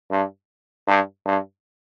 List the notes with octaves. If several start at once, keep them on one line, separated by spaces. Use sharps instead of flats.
G2
G2
G2